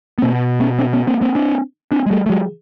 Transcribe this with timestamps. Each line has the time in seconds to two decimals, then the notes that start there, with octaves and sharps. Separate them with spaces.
0.18 B3
0.22 B2 A#3 C4
0.60 B3 C#4
0.78 C4 D4
0.93 B3 C#4
1.07 A#3 C4
1.21 A#3 C4
1.35 C4 D4
1.91 C4 D4
2.06 G#3
2.11 G3 A3
2.26 A3
2.30 F#3 G#3